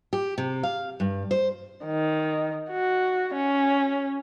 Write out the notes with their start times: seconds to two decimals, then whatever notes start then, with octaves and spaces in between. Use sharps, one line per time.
0.13 G4
0.38 C3
0.63 F5
1.00 G2
1.31 C5
1.85 D#3
2.71 F#4
3.36 C#4